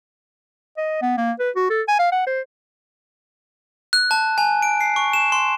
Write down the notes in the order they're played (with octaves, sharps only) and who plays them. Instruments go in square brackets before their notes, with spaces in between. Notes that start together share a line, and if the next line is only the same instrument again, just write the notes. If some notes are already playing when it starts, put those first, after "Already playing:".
[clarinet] D#5
B3
A#3
B4
F#4
A4
G#5
F5
F#5
C5
[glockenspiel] F#6
A5
G#5
D7
C7
C#6
E7
C6